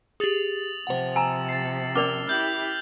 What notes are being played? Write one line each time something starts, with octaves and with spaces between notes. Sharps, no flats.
G4 G#4 D#6 A6 F#7
C3 F3 C5 F#5
G#5 A#5 E6 E7
A6 C7
C#4 A#4 D5 D6 F6 F7 G7
E4 G4 F6 G6 F#7